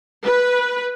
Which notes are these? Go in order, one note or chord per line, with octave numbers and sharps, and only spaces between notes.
B4